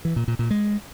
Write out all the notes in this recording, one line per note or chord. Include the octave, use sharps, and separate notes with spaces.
E3
A#2
A#2
A#2
G#3